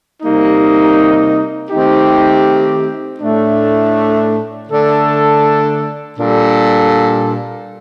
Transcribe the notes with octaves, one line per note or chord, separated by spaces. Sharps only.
C3 G3 A#3 D#4
D#3 A3 C4 D#4 G4
A2 A3 D4
D3 A3 D4 A4
A#2 G3 D4 A4